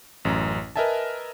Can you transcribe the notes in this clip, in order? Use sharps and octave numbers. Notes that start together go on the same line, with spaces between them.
A1 F#2 A#5
A#4 B4 D#5 E5 G#5 A5